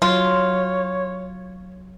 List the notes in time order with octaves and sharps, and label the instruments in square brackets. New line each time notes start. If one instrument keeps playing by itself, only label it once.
[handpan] F#3 [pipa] F4 [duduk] C#5